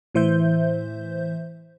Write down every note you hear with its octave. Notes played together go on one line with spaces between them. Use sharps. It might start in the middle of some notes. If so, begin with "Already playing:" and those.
A2 E3 C5 E5 G6